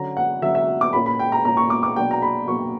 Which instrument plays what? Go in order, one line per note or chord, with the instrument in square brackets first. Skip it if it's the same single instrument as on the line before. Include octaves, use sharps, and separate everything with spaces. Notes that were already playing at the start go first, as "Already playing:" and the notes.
Already playing: [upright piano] D3 F#3 C#4 A#5
F#5
D3 F#3 C#4 E5
E5
D6
A#2 A#3 C#4 B5
B5
G5
A#5
A#2 A#3 C#4 A#5
C#6
D6
D6
B2 F#3 A#3 D4 G5
A#5
B5
B2 F#3 A#3 D4 C#6